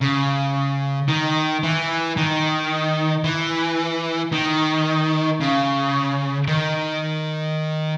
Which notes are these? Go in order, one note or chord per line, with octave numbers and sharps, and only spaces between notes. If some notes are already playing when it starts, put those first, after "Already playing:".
C#3
D#3
E3
D#3
E3
D#3
C#3
D#3